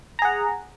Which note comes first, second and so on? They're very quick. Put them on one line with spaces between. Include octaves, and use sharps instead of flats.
A#5 G#4 F#5